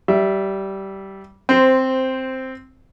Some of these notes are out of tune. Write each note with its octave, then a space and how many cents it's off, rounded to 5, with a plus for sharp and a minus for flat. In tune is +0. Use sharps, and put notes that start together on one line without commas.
G3 -15 E5 +0
C4 +0 C5 -10